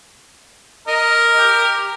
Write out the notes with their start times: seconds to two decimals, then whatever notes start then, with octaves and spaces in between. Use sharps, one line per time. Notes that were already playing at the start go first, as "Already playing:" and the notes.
0.87 A#4 D#5
1.38 G4